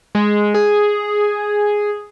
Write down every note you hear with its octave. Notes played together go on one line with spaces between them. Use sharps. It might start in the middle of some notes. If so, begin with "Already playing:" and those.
G#3
G#4